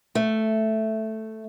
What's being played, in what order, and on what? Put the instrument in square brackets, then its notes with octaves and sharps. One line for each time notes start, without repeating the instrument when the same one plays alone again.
[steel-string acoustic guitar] A3